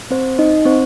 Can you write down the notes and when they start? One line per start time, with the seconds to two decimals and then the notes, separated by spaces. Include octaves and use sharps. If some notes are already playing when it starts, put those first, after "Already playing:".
0.11 C4 C5
0.39 D#4 D#5
0.65 C4 C5